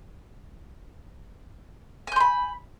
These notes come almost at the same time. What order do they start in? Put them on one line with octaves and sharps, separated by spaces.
G#5 G6 C6 B5